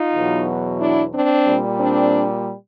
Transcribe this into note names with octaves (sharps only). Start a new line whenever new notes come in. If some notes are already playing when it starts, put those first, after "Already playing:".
Already playing: D#4 F4
E2 B2 F#3
D4 E4
C4 D4
A#2 G3
C4 D4